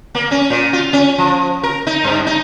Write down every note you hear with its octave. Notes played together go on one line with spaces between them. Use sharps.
A#3
C#4
A#2
F4
C#4
F3
A#4
D#4
G2
D#4